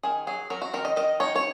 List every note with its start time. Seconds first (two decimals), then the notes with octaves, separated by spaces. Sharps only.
0.03 D#3 G#4
0.27 F#3 G#4
0.50 F#3 A#4
0.62 F#4
0.73 D#3 A#4
0.85 D#5
0.96 D#3 D#5
1.20 D#4 C#5
1.36 C#5